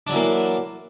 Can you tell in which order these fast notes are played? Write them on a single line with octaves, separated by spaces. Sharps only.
D4 F#3 E3 A#3